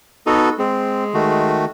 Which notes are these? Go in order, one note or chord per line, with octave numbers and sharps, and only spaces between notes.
B3 D#4 F#4 A4
G#3 C4
D#3 A3 F#4